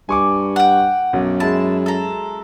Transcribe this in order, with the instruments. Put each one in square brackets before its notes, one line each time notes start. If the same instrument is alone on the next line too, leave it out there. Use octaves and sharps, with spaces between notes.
[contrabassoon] G2 [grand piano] G#5 C#6 D6
[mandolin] F#5 G5
[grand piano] B1 [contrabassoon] F#2
[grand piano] G#3 E4 [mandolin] A5
[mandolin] A4 A#5